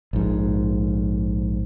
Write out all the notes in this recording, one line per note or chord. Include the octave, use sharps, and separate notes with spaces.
A#1 G#2